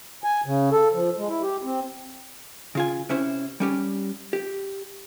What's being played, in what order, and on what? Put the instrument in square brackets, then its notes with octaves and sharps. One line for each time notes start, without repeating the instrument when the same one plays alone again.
[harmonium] G#5
C#3
A4
F3
G#3
E4
G4
C4
[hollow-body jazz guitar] C#3 F4 G#5
C3 C#4 E4 C5
G3 C#4 G4
G4